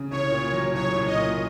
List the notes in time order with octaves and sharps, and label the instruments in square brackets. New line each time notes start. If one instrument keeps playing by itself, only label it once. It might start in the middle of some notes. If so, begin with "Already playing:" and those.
Already playing: [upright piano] C#3
[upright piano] C2 [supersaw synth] C#5
[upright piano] A#2
F#3
[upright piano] C2 [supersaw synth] C#5
[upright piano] C2
[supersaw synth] D#5
[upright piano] A#2